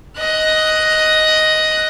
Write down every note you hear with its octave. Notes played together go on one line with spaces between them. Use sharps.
D#5 F#6